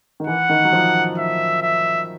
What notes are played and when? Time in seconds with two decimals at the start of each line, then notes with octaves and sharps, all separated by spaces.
0.20 D#3
0.27 E3 F#5
0.49 D#3
0.65 F#3
0.73 F3
1.18 E5
1.62 E5